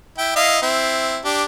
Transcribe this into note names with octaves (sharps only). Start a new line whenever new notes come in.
E4 G5
E4 D#5 F5
C4 E4
D4 G4